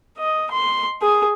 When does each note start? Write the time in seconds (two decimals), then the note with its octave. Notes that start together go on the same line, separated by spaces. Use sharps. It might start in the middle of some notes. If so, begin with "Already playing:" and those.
0.18 D#5
0.52 C6
1.02 G#4